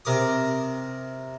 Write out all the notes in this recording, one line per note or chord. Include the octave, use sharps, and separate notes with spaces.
C3 A#4 D6 D#6